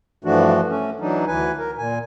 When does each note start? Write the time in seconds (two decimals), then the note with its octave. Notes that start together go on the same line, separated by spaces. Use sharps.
0.25 G2 E3 F3 A3 D4 F#4
0.69 A3 C#4
1.00 E3 F#3 D4 D#4
1.27 D2 E3 B4 G#5
1.59 A#4
1.78 A#2 G#5